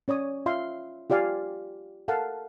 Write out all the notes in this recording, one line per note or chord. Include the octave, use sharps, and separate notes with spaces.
C#4 C#5 D5 D#6
F4 E5 F5 C6
F4 G4 D5 F5 G#5
A4 A#4 F5 F#5 A5